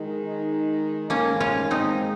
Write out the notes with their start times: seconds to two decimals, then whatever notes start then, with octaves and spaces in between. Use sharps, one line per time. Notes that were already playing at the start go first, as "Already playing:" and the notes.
Already playing: D#3 G#3 D#4
1.10 G#2 D#3 G#3 A#3 C#4
1.40 C#4 F4
1.71 C4 D#4